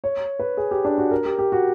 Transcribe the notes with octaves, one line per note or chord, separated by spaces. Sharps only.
C#5
B4
G#4
G4
D4
F#4
A#4
G4
G4
F#4